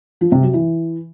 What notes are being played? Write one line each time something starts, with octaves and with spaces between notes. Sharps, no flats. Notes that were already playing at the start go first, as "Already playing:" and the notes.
F3
C3
F#3
E3